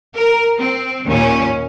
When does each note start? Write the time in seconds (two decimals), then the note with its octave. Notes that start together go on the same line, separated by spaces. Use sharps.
0.16 A#4
0.56 C4
1.07 D#2 A#2 C#4